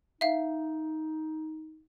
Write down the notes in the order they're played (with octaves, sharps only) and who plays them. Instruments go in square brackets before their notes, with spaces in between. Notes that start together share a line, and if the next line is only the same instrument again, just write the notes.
[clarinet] D#4 [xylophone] E5 F5